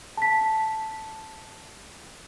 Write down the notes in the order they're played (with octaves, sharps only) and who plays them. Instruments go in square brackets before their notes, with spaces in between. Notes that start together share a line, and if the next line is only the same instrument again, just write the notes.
[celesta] A5 B6